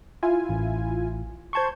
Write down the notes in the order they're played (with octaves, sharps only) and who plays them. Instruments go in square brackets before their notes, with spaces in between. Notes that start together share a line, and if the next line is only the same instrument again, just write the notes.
[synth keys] E4 F4 G#5
[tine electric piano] A1
[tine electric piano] C5 A5 C#6 [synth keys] C6 G6 G#6